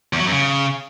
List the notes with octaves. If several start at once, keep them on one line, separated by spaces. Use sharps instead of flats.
E2
F#3
F#2
C#3